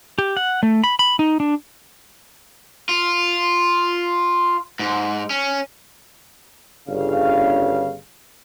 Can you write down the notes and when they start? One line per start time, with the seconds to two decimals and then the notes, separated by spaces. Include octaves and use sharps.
0.18 G4
0.37 F#5
0.63 A3
0.84 B5
0.99 B5
1.19 D#4
1.40 D4
2.89 F4
4.79 G#2
5.30 C#4
6.88 G1 C#3 F5